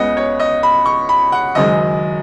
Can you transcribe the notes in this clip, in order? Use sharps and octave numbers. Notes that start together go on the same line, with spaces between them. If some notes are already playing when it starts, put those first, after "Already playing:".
Already playing: C#2 C#3 B3 D#5 F#5
C#5
D#5
B5
C#6
B5
F#5
F#1 F#2 D#3 G#3 D#5